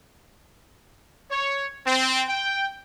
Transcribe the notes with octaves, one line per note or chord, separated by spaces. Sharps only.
C#5
C4
G5